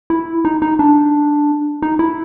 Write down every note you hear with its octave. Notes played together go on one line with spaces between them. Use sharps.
E4
D#4
D#4
D4
D#4
E4